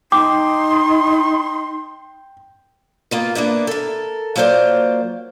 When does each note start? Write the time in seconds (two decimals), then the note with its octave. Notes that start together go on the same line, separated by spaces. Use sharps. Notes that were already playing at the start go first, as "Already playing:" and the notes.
0.12 D#4 G5 C6 D6
3.11 B2 A#3 F4
3.35 A#3 B3 D4 E4
3.67 A4 A#4
4.36 F#3 A#3 F4 C5 D5